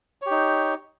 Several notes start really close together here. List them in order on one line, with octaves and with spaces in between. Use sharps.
C#5 G4 D#4